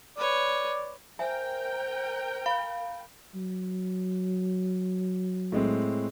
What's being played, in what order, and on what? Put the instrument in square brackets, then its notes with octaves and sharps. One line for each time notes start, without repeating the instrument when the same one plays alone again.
[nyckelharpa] B4 C#5 [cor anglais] D5
[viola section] A#4 G5 [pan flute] C5 [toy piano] E5 G#5
[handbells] F5 [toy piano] B5
[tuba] F#3
[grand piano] A2 G#3 C4